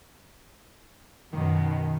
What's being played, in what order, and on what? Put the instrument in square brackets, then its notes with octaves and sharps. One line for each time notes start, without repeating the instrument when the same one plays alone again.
[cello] F#2 B2 [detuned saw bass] D#3